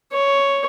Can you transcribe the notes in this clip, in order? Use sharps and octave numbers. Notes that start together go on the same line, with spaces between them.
C#5